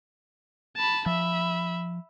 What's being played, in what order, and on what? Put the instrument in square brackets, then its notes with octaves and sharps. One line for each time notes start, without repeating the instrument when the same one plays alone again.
[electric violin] A5 B5
[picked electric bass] F3 [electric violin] E5 B5